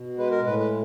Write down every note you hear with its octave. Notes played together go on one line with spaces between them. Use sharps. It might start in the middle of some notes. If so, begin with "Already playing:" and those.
Already playing: B2
G#3 B4
A#4
A2 B4
B4